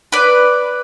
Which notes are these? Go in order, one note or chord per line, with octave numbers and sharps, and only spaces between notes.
B4 D5